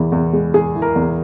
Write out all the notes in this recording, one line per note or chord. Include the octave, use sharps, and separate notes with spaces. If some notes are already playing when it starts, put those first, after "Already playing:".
Already playing: E2 E3
E2
G#3
G#3 G#4
E3
A#4
E2